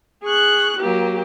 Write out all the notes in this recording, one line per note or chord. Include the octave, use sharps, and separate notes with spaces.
G#4 C#6 F#6
F#3 A#3 G4